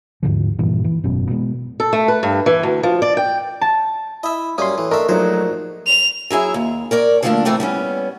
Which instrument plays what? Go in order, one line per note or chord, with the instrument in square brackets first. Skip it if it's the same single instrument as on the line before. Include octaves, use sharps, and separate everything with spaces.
[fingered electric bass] D#2 G#2 D3 F3
G2 A#2 E3
E3
G#1 F#2 B2 C#4
B2 G#3 B3
[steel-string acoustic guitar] A4
A3
B4
G2
E3
D2
F3
D5
G5
[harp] A5
[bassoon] E4 [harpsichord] D#5 E5
[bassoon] F#2 [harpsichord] G3 A#3 C#4 [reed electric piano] C6 D#6
[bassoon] A2 [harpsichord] E3
[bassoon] A3 [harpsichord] D4 E5 [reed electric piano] A#4 D#5
[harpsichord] A#1 C5 [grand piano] F#3 A3 [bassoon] D#4
[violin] F7
[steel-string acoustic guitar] F#3 E4 G#4 E5
D#2
A#4 C#5 D5
D3 F3 G3 A3 A#3 D4
C3 E3 A3 C4
G3 B3 C#4